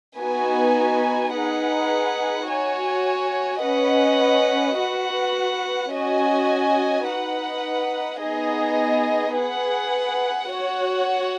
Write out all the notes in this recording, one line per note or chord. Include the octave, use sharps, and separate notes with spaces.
B3 D#4 F#4 B4 G#5
D#4 G#4 B4 F#5
F#4 C#5 G#5
C#4 B4 D#5 F#5
F#4 B4 F#5
C#4 F#4 D#5 G#5
D#4 B4 F#5
B3 D#4 G#4 D#5
G#4 B4 F#5
F#4 C#5 F#5